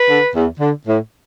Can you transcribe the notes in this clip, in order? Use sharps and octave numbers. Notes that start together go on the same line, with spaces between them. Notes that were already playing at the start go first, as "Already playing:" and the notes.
Already playing: B4
D3
E2
D3
A2